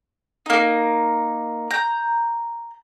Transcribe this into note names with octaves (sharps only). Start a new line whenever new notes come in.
A#3 D#4
A#5 G6